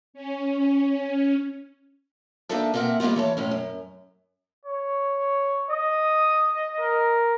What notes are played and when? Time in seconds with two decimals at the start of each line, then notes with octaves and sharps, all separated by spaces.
0.14 C#4
2.49 A#3 D4 D#4 A4 E5 A5
2.74 A#3 C4 A#4 E5 F#5
3.00 G3 G#3 A#3 B3 F4
3.16 E3 C#5 A5
3.37 F2 A2 C#4
3.51 F#2
4.66 C#5
5.70 D#5 D#6
6.81 A#4